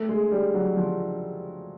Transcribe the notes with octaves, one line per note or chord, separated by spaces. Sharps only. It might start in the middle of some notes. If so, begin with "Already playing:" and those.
Already playing: A3
G#3
G3
F#3
F3